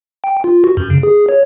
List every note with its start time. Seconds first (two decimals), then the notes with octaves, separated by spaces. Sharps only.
0.24 G5
0.44 F4
0.64 F#4
0.77 F#2
0.90 C#3
1.03 G#4
1.29 C#5